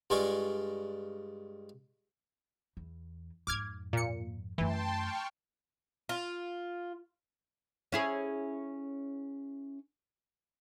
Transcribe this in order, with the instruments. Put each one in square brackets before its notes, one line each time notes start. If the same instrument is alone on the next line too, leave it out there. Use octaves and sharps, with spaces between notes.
[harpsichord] G2 G#3 F4 G#4 D5 C#6
[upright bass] E2
[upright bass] F2 G#2 [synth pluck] D6 F6 G#6
[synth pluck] A#2 C#7
[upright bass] F#2 A3 [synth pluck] E3 [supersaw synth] G5 A5 C6
[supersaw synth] G5 C#6 F6
[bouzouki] F4
[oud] C#4 E4 G#4